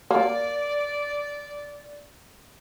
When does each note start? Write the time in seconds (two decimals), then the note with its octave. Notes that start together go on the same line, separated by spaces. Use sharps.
0.10 A#3 D5